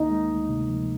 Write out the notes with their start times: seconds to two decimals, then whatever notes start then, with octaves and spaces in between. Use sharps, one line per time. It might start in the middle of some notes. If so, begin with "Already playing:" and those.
Already playing: D2 A#3 D#4
0.10 G#3
0.29 D2
0.49 C3
0.68 F3